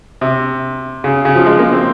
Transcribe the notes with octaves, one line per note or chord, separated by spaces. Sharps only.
C3
C#3
C#3
F3
G#3
A#3
C4